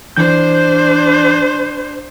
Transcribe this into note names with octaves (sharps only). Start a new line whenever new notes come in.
E3 D4 C5 G6